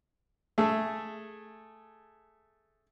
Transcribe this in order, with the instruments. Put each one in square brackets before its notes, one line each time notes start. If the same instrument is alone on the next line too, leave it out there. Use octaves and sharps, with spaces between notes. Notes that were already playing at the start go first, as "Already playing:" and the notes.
[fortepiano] A3 G#4 A4